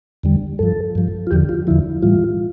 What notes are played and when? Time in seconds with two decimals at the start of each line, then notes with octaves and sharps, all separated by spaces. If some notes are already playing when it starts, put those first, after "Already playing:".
0.23 E2 D3 G3
0.59 G2 F3 A4
0.95 G2 F3
1.27 F4
1.31 E2 D3 F3 G4
1.49 F4
1.67 E2 D3 F3 E4
2.02 A2 E3 G3 F4